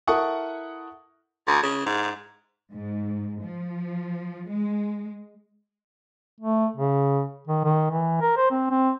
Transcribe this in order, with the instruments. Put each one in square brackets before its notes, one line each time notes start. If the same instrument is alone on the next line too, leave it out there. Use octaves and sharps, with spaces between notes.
[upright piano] E4 A4 A#4 F#5 C#6 D#6
[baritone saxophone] D2
C#3
G#2
[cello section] G#2
F3
G#3
[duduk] A3
C#3
D#3
D#3
E3
A#4
C5
C4
C4